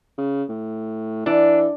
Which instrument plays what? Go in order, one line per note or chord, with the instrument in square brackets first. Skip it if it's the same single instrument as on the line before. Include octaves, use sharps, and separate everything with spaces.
[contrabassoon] C#3
A2
[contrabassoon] E3 [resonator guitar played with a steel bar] D4